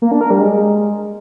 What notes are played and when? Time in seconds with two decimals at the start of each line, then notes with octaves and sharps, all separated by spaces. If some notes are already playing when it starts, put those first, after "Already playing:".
0.02 A#3
0.11 D4
0.21 A#4
0.30 G3
0.40 G#3